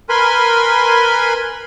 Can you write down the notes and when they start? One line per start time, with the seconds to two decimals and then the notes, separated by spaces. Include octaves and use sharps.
0.09 A#4 B4 G#5 B5 C6